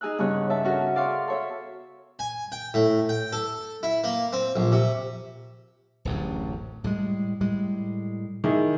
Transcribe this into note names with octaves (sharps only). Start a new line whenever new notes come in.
D#4 G#4 G#5 E6 F#6
G2 C#3 B3 C#5 F#6
C#5 E5 A5
C#4 F#4 A4 A#4
G#4 D5 F5 C6 C#6
A4 C#5 E5
G#5
G5
A2
G5
A4
E4
A#3
C4
A#1
C3
D1 A1 F#2
A2 G3 G#3
A2 G3 G#3
D#3 E4 G#4